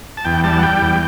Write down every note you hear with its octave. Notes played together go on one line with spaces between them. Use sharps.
A5
E2 G5
G3 A5
F#5
G3 G5
E2